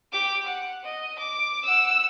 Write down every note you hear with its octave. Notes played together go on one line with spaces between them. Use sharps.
G4 D6
F#5
D#5
D6
F#5 E6